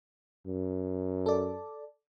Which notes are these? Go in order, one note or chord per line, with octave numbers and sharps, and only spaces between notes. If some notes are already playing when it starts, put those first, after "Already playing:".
F#2
A4 D5